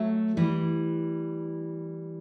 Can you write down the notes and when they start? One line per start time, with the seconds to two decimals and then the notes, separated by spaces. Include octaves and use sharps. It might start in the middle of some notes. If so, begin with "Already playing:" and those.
Already playing: F#3 A3
0.37 E3 G3